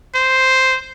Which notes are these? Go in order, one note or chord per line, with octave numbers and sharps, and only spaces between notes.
C5